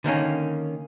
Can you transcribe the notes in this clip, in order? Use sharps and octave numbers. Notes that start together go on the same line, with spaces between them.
D3 D#3 A#3 C#4